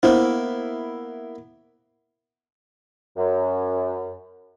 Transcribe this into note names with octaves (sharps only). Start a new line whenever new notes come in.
A#3 B3 E4 C5
F#2